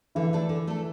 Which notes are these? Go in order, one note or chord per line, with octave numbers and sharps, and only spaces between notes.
D3 E3 E4
A3 D4 A4
D3
A3 D4 A4